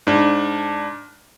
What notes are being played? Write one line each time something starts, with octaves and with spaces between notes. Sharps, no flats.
G#2 D4